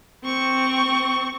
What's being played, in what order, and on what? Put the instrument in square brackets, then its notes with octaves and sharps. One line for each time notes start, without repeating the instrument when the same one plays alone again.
[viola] C4 C#6